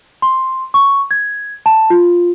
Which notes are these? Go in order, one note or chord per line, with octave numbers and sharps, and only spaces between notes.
C6
C#6
G#6
A5
F4